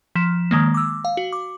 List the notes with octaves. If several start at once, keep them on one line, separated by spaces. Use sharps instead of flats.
F3 B6 E7
D#3 G#3 A#3
D6 E6
F5
F#4
D6